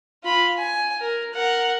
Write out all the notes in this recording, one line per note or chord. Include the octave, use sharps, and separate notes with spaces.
F4 B5
G#5
A#4
A#4 F#5